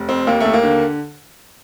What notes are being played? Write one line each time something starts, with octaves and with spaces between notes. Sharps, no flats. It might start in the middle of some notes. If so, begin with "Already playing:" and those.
Already playing: F1
F2 C4
D#2 A#3
D#2 A3
A#3
D3